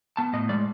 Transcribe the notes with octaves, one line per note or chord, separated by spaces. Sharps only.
B3 A5
A2 D#5
G#3 D5